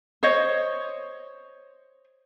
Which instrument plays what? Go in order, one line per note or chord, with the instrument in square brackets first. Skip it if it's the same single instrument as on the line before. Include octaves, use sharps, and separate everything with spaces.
[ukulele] C5 C#5 D#5